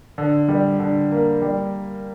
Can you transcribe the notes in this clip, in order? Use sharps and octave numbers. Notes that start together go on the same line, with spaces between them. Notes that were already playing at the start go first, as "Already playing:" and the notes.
D3
G3
D3
A#3
G3